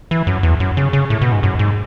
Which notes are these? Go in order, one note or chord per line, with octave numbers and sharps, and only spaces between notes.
E3
F#2
E2
F#2
C#3
C#3
A2
B2
G#2
F#2
G#2